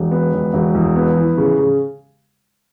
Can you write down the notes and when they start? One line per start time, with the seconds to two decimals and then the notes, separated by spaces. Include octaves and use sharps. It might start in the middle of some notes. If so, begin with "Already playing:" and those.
Already playing: E1
0.11 B3
0.33 E1
0.54 E1
0.75 E2
0.96 B3
1.17 E3
1.38 C#3
1.59 C#3